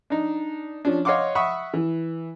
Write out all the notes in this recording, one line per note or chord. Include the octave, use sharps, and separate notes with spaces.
D4 D#4
F3 C#4 D4
C#5 D#5 F5 F#5 C6 D6
E5 F#5 B5 C#6 D#6
E3